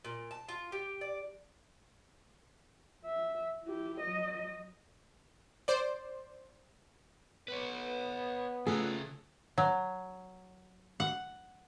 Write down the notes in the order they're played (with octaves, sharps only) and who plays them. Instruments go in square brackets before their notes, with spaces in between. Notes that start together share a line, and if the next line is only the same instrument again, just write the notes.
[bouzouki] A#2
A5
F4
G4
D5
[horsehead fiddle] E5
E4 G4
F#3 D#5
[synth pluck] C5 D5
[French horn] B3 [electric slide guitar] B4 C#5
[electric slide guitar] C#3 C#4 A#5 [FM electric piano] A3 F4 F#6 [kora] G#4 A4
[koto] F#3
F#5